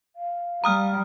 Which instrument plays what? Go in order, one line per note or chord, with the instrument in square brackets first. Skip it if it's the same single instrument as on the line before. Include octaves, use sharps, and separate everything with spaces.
[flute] F5
[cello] G3 [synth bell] A#5 D#6 F6